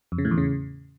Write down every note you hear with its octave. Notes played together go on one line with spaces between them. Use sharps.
F2
C#3
A2
E2
C#3